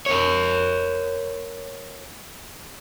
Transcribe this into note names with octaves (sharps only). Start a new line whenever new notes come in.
A#4 C#5